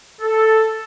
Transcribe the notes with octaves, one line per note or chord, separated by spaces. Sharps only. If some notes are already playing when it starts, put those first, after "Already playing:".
A4